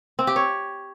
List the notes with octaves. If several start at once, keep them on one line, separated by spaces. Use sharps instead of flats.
C4
G4
C#5